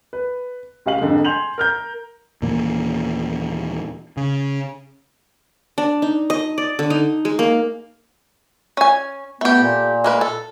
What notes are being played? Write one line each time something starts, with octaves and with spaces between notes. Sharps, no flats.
B4
C#2 G4 F5 F#7
F2 G#2 D3
G#5 C6 G6 F7 F#7
A#4 F6 G6
D#2 A#2 E3 A#3
C#3
D4
D#4
D#5
D5
D3
D#4
G#3
A#3
C#4 G#5
A3 B3 G4
A#2
G#3 A#3 B4
A4